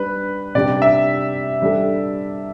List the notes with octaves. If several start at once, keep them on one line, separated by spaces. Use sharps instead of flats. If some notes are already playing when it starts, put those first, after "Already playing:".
Already playing: G3 D4 B4
C3 G3 D4 G4 D5
E5
G3 D4 A4